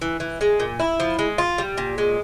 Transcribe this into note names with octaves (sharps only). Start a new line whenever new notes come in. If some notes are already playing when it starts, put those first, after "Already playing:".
E3
E3
G#3
A#2
E4
F3
G#3
F4
G3
A#2
G#3